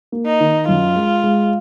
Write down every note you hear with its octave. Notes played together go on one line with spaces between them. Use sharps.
A#3
D#4
D#3
F#2 F4
G#3
G#3